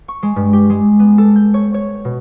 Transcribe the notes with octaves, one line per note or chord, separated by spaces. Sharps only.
C#6
G#3
G2
G4
G#3
B3
A4
G6
C#5
C#5
B2